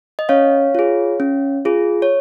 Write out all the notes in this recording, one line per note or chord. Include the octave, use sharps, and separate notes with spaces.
D#5
C#4 C#5 F5
F4 G#4
C#4
F4 G#4
C#5